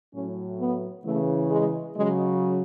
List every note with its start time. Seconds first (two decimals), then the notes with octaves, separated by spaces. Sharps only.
0.12 A2 F#3 C#4
0.59 B3
1.04 C#3 E3 A3
1.50 G#3
1.95 C#3 F#3 G#3